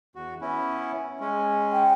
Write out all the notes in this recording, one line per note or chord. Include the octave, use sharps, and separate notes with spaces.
E2 F#4
B3 C#4 E4
G#3 C#4
G5